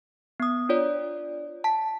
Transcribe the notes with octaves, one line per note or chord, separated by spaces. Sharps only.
B3 D#6
D4 F4 C#5 D5
A5 B6